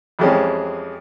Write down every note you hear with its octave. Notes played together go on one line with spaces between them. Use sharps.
F2 E3 G3 G#3 C4 C#4